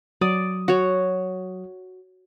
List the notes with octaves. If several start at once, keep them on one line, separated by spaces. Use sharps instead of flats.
F#3 D5 D#6
F#4 C#5